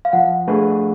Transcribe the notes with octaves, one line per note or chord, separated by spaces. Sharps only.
F5
F3 F#5
A3 D4 G#4 B4